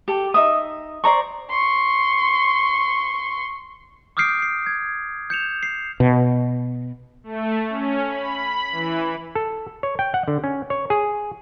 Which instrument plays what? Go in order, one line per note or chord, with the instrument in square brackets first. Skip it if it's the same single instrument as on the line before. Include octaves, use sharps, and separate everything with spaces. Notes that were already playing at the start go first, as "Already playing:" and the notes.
[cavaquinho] G4 A4
D#4 E5 D#6
C5 D5 A#5 C#6
[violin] C6 C#6
[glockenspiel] D6 D#6 F6 G6 C7 D7
C7
G#6
G6 C#7 E7 F7
C7
[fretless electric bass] B2
[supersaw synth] A3
C#4
B5
E3
[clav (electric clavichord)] A4
C#5
G5
F#5
D3
C#4
C#5
G#4